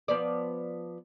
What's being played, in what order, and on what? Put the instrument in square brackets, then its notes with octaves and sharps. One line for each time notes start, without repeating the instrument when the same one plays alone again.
[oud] F3 B3 D5